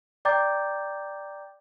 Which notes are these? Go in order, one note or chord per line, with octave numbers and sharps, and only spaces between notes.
D5 G5 A#5 D6 G6 A6